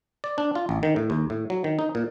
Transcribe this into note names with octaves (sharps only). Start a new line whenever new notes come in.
D5
D4
F4
A1
D#3
A2
D#2
A2
F#3
D#3
D#4
A#2